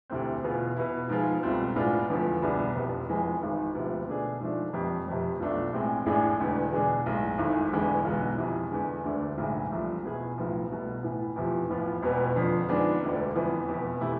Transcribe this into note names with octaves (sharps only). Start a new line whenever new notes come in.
D2 C3 E3 A3 C4
E2 B2 B3 F4 G#4
B2 B3 E4
G#2 F3 B3 F4 G#4
C2 B2 A3 C4 F4
A2 G#3 B3 D4 F4
F1 E2 D3 F3
C2 B2 B3 D4 G#4
F1 F2 C3
F1 F2 E3 G#3 B3
G#1 G#2 G#3
D2 C3 F3 B3
B2 A3 D4 G#4
G#2 F3 A3 D4
F1 F2 C3
F1 F2 C3
B1 B2 A3 D4 F4
A1 A2 E3 G#3 C4
A1 A2 G#3 D4 G#4
E1 E2 D3
B2 G#3 D4 G#4
B1 A2 G#3
G#1 G#2 E3 A3
E1 E2 D3 G#3 B3
B1 B2 G#3
F2 C3 E3
E2 D3 G#3
D2 D3 A3 D4 G#4
B1 A2 E3 G#3
C2 C3 F3 A3
E2 B2 B3 E4 G#4
B1 A2 F3 B3
C2 B2 A3
A2 E3 B3
E2 C3 F3
A1 A2 F3 B3 F4
E1 E2 B2 B3
F2 D3 F3
G#2 F3 B3 D4 G#4
E1 D2 D3
F2 E3 B3
F1 E2 B2
C3 E3 A3 E4